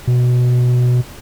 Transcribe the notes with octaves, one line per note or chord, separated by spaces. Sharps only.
B2